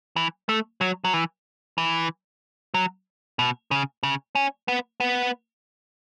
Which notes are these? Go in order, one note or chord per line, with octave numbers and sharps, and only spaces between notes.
E3
A3
F#3
F#3
E3
E3
F#3
B2
C#3
C#3
C#4
B3
B3